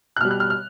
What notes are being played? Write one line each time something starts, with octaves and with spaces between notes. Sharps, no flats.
F#6
B2 G3 F6
F#6
F6
F6